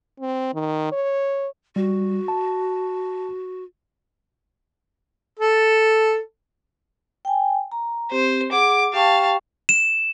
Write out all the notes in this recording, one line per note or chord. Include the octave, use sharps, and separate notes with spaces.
C4
D#3
C#5
G3 F#4
A5
A4
G5 G#5
A#5
C4 G4 C5
G#4 F#5 D6
G4 F5 G5 A5 C#6
E7